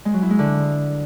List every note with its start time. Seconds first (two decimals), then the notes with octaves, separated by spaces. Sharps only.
0.05 G#3
0.14 F#3
0.22 E4
0.30 G#3
0.39 D3